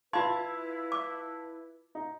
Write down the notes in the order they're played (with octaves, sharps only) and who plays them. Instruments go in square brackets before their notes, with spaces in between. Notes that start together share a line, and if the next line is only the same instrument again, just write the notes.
[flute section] E4 B4 [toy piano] F4 C6 [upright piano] F5 A5 G#6
[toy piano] D6
[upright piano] D#4